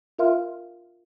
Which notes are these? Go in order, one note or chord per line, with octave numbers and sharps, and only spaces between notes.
F4 A#4 E5 F5 C6 F6